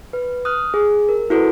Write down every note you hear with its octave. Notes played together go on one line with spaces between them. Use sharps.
B4
D#6 F6 F#6
G#4
A#4
E4 F#4 A4 B4